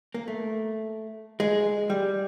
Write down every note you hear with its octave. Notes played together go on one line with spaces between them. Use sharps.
A#3
A3
G#3
G3